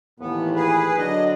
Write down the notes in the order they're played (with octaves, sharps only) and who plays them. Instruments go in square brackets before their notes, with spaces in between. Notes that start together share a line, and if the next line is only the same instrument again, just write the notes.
[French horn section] D#2 A2 E3 [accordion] B3
[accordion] G#4 B4
[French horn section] D3 F#3 D4 [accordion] D#5